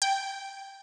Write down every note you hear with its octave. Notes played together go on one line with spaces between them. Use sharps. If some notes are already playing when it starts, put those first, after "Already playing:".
G5